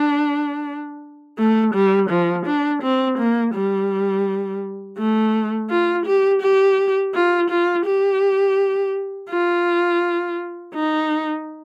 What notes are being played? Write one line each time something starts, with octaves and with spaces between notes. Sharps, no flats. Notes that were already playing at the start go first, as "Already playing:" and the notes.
Already playing: D4
A3
G3
F3
D4
C4
A#3
G3
A3
F4
G4
G4
F4
F4
G4
F4
D#4